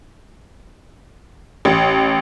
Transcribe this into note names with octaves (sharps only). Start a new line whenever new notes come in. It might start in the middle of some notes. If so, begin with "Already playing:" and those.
A1